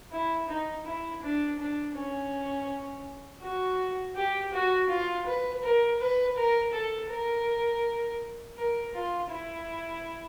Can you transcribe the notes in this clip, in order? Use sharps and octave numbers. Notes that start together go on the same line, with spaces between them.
E4
D#4
E4
D4
D4
C#4
F#4
G4
F#4
F4
B4
A#4
B4
A#4
A4
A#4
A#4
F4
E4